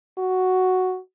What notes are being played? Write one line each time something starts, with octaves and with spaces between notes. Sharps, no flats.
F#4